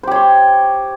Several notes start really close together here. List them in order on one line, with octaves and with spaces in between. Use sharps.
C5 G4 C#5 C6